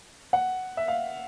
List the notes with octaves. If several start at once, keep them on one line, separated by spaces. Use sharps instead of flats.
F#5
E5
F5